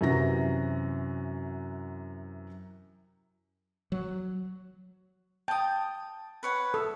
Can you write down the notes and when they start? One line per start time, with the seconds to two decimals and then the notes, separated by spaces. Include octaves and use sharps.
0.01 F#2 C3 E3 F#4 A#6
3.92 F#3
5.48 G5 A5 D#6
6.43 B4 C#5 F#5
6.74 A4